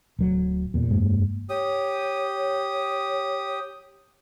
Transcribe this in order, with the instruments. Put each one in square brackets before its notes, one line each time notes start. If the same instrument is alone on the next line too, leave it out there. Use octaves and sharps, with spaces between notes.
[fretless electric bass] D1 F#3
E2 A#2
F1 G2 G#3 A#3
[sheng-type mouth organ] G4 D#6 [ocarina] C#5